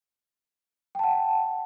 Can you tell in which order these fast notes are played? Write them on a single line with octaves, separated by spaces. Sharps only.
G5 A5 F#5